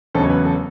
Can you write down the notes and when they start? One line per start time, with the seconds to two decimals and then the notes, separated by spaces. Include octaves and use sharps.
0.15 E1 E2 C#3 F#3 C#4 A4
0.23 C#5
0.30 B4
0.45 A4